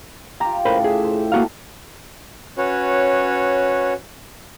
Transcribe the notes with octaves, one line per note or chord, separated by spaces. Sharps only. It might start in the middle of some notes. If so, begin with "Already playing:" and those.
F4 G4 A#5
A2 C#3 A#4 C5 B5
G#4 E5
C5
A#3 F#4 F5 A5 A#5
C#4 F#4 B4 C#5